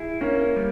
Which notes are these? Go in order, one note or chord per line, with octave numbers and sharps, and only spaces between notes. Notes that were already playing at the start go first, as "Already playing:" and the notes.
Already playing: E4 G#4
A#3 C#4
G3